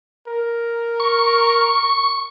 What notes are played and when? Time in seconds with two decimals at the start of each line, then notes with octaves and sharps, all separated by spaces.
0.28 A#4
1.00 C#6